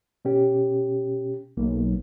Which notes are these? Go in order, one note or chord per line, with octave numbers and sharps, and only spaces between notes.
B2 C#4 G4
B1 A#3